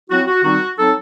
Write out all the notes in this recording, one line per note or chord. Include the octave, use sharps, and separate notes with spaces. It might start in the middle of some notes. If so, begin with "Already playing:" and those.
F#3 C4 E4 F#4
F#4
D#3 G3 C4 D#4 F#4
F#3 C4 D#4 A4